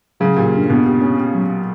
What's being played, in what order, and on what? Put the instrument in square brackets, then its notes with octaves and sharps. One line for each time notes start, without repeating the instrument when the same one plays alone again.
[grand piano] C#3 [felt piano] F#3
[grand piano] A#2 [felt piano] G4
[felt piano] G2
[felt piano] G2 [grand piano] B2
[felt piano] G4
C#4
G4
F#3